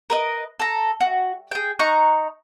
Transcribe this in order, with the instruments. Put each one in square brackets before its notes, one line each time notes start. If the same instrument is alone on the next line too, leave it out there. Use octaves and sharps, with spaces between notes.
[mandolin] A#4 B4 D#5
A4 A#5
F#4
G#4 G5
D#4 A#5 C#6 F#6